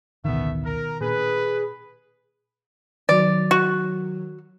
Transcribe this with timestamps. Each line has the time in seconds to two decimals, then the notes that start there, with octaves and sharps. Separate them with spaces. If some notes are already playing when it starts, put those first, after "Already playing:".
0.25 A1 D2 B2 D#3 A3 B3 E5
0.65 A#4
1.01 A#2 D4 G#4 B4
3.09 D#3 F#3 D5
3.51 F#4